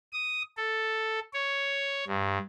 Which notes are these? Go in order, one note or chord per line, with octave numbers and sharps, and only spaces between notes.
D#6
A4
C#5
G2